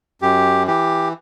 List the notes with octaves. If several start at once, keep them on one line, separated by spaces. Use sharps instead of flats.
F#2 G4
E3 G4